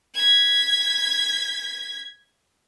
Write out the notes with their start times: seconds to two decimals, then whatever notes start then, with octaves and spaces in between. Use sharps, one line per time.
0.14 G#6 B6